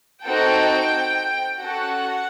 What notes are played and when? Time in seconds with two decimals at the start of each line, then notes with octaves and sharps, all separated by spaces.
0.24 C4 D#4 F#4 A4 G5
1.60 C#4 F#4 A4 F#5